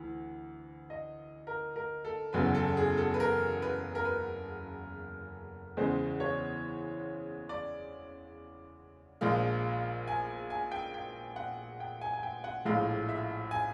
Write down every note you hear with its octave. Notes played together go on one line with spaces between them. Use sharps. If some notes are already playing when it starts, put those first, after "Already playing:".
Already playing: D2 E3
D#5
A#4
A#4
A4
F#1 E2 C#3 F#3 B4
A4
G#4
A4
B4
A#4
B4
A#4
B4
E2 C#3 E3 G#3 C5
C#5
D5
A#1 A#2 F3 G#3 F5
G#5
G#5
G5
G5
F#5
G5
G#5
G#5
G5
F#5
A#1 A2 F3 G#3 F5
E5
G#5